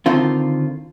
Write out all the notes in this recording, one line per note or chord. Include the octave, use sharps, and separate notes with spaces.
D3 D#3 C4 F4